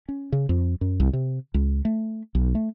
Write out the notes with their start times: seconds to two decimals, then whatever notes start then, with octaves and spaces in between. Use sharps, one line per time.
0.09 C#4
0.32 C#3
0.49 F2
0.81 F#2
1.00 C2
1.13 C3
1.54 C#2
1.85 A3
2.35 B1
2.55 A3